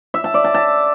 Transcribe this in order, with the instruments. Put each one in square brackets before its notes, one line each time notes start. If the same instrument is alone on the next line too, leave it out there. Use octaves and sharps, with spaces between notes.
[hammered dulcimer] E5
A5
D5
A5
A5